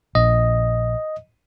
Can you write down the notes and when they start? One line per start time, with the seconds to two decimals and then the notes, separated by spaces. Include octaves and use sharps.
0.15 A#1 D#5